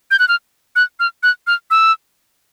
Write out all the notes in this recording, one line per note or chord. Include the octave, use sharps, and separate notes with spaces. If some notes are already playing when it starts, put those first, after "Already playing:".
G6
F#6
F6
F#6
F6
F#6
F6
E6